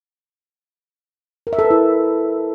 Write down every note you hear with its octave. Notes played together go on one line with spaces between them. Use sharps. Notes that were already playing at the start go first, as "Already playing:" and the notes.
A#4
E5
A4
B4
E4